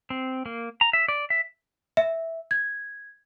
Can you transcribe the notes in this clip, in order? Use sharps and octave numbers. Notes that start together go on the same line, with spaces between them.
C4
A#3
A#5
E5
D5
E5
E5
G#6